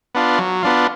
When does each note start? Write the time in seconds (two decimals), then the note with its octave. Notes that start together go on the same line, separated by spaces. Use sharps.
0.15 B3 D4 F4
0.39 F#3
0.63 B3 D4 F4